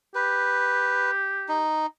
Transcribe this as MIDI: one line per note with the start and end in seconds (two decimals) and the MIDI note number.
0.15 1.68 67
0.15 1.11 71
1.48 1.86 63